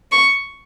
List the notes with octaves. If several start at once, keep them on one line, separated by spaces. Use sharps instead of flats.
C#6